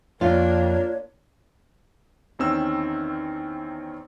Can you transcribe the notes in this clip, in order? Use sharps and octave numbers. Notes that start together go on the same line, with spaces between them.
F2 A#3 D4 F4 A#4 C#5
E2 D#3 C4 C#4 E6